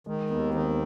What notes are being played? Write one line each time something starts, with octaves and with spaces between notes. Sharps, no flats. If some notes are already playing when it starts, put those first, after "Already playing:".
D#3 G#3
D#2 B3
D#3 C4